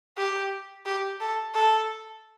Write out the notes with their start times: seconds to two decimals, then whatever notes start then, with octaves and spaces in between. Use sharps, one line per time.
0.17 G4
0.86 G4
1.20 A4
1.55 A4